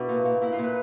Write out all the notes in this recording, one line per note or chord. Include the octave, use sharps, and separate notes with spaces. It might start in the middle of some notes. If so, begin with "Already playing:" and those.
Already playing: B2 D4 E4
A#2
A#2
A#2 E4
F4
A#2 B4